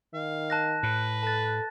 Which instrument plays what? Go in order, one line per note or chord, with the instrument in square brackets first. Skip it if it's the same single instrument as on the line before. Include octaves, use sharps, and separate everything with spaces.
[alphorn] D#3 [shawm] F5
[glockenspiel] A5 F#6 A#6
[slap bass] A2 [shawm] B4
[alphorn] A4 [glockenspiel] A5 A6